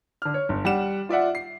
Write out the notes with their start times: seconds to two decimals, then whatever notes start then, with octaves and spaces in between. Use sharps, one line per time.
0.22 D3 F6
0.34 C#5
0.49 G1
0.65 G3 F#5 E7
1.09 F4 D5 E5 F#5
1.35 C7